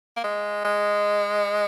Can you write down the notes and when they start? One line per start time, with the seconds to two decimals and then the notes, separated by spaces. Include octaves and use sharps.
0.17 A#3
0.24 G#3
0.65 G#3